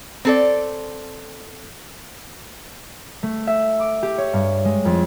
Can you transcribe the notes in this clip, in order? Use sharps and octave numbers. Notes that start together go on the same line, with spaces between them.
C4 A4 D5
A3
E5
D6
G4
C#5
G2
G#3
F2